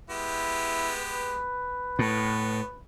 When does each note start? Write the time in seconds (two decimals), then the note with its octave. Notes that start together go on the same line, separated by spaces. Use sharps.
0.10 G#3 B3 E4 G4
0.98 B4
1.99 A2 B3